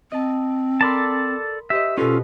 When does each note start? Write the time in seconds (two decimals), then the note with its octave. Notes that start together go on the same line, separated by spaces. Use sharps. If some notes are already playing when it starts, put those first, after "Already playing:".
0.12 C4 D#5 A5
0.81 A4 A#4 D5 A5 B5 C6
1.70 G4 C5 D#5 E5
1.98 B2 C#4 F4 F#4 A4 B4